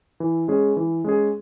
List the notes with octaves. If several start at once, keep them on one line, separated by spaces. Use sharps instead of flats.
E3
G#3 C#4 G#4
E3
G#3 C#4 G#4